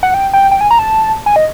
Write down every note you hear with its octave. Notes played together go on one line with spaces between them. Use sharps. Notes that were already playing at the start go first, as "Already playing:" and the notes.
F#5
G5
G5
G5
G#5
A#5
A5
G#5
D#5